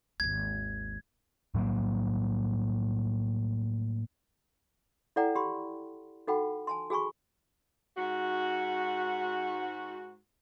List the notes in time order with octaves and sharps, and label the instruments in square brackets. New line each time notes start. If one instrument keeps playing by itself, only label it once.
[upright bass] G#1 D#2 [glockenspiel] G#6
[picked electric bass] A2 F#3 G3 A#3
[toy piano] E4 A4 D5 F#5 G5 A#5
G4 B5 C6
D#4 F#4 A4 F#5 G5 B5
G#5 A5 C6
F#4 G#4 G#5 B5 C#6
[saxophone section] G#2 F#4